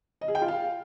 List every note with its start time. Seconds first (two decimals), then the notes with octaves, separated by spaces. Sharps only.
0.21 D#5
0.28 G#4
0.35 G5
0.42 F4
0.48 F5